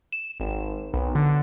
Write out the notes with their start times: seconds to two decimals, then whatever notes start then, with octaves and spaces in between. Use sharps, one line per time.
0.13 E7
0.40 G#1
0.94 B1
1.15 D3